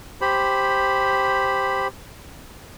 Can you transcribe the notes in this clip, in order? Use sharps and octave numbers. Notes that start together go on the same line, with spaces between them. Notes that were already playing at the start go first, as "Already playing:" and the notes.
G4 C5 B5